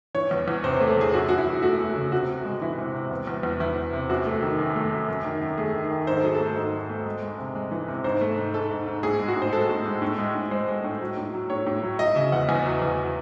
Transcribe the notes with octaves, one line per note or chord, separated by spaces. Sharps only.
E3 C#5
E2
E2
C3 C5
A3 C5
A4
E2 G#4
F#2 F#4
F#2 F#4
E4
E3
A3 F#4
A3
C#3
C3 F#4
C3
G#3
E3 E4
C3
C3
E2
E2
E2
E2 E4
E2
C3
F#2 F#4
A3
D#3
F#2
A3
F#2
F#2
D#3
F#2
A3 G#4
D#3
D#3
G#2 C5
A4
F#3 G#4
A4
A3
G#2 A4
F#3
A3
G#3
G#3
C3
G#3
E3
C3
G#2 C5
A3
G#2
G#2 A4
G#2
G#2
A2 G#4
G#3
F#4
A2
C5
G#3 A4
A2
G#3
A2
G#3
A2
G#3 C5
G#3
A2
F#3
A2
F#3
A2 C#5
A2
F#3
F#3 D#5
C#3 E5
E2 F#5
E2 G#5
F#3
E2